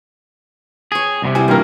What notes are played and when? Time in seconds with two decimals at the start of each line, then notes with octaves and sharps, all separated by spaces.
0.92 G#4 C#5 G5
1.22 C2 A2 C3
1.35 G3 E4 C5 G#5
1.48 G2 E3 A#3 F4 A#4